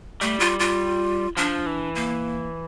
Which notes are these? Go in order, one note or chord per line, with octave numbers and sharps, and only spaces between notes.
G3 A3
F4
F4
F3 D4
E3
A#3